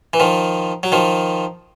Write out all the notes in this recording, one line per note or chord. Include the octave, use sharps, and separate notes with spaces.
E3
D#3 F3
F#3
D#3 F3